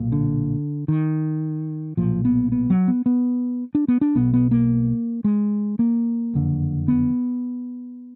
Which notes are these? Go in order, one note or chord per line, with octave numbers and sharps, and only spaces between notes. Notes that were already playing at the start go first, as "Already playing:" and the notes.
Already playing: B1 A#2
D3
D#3
B1 A#2 F3
B3
B3
F#3
B3
B3
D4
B3
D4
B1 B2 B3
B3
A#3
G#3
A#3
F#1 F2 D3
B3